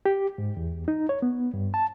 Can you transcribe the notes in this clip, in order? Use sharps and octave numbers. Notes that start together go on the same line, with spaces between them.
G4
G#2
E2
D#4
C#5
B3
G2
A5